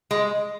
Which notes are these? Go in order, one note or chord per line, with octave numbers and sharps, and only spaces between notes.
G#3